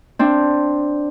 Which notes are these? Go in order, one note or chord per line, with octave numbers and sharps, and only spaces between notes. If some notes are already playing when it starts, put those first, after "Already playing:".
C4 D4